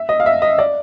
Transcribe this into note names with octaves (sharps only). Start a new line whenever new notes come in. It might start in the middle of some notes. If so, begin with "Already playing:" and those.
Already playing: E5
D#5
F5
E5
D#5
D5